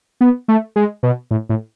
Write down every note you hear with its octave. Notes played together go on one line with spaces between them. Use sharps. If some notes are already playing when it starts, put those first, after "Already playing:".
B3
A3
G#3
B2
A2
A2